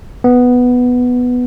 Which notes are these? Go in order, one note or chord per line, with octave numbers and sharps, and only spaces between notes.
B3